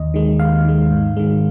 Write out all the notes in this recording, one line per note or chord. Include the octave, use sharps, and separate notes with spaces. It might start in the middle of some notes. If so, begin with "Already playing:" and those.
Already playing: D#2 D#5
D#3 G#3
D#2 F5
D#3 G#3
G#2
D#3 G#3